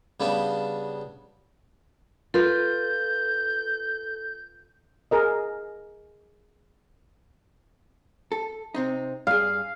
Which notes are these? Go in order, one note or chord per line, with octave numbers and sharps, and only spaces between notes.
C#3 G3 B3 D4
F4 A4 B4 G6
G#4 A#4 D#5
A4
C3 C4 D#4
G2 G#4 F5